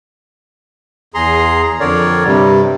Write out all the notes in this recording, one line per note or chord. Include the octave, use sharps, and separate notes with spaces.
E2 G#4 A#5 C6
F2 D3 A#4 C#5 D5
G2 C3 G3